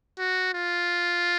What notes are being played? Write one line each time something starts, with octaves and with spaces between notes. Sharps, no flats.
F#4
F4